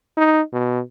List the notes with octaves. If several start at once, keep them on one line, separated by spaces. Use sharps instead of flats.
D#4
B2